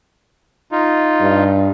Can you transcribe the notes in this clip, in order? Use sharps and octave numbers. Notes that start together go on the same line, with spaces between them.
D#4 F4
G2